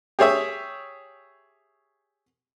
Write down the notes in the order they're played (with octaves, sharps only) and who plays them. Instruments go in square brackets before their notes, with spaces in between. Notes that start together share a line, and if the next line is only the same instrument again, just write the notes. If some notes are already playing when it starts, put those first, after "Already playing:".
[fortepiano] G4 G#4 C#5 E5